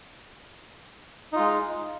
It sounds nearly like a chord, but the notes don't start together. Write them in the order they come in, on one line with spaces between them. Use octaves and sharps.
D#4 F4 G#3